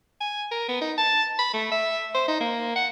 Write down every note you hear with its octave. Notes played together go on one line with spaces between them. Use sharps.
G#5
A#4
B3
D#4
A5
B5
A3
E5
C5
D#4
A#3
F#5